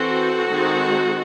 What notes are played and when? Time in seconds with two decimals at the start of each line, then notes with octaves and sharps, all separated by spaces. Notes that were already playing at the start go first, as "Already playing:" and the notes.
Already playing: E3 C4 F#4 A4
0.50 D#3 G#3 C4